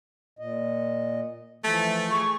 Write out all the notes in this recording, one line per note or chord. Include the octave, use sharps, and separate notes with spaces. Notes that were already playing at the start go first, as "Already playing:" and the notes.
A#2 D#5
E3 F3 A3
G#4 C#6